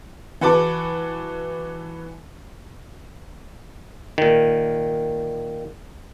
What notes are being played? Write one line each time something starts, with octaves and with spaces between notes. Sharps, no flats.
E3 F#4 B4 A5 D6
A#2 D#3